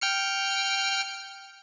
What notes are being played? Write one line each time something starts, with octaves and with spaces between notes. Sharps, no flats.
G5 F6 C#7